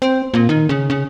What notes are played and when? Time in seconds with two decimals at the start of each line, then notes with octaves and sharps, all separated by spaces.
0.02 C4
0.34 A#2
0.49 D#3
0.69 C#3
0.90 C#3